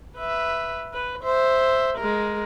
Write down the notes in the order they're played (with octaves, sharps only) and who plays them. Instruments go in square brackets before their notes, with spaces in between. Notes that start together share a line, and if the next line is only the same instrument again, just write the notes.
[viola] B4 E5
B4
C5 E5
G#3 A#4